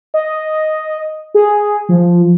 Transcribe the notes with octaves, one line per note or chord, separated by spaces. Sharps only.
D#5
G#4
F3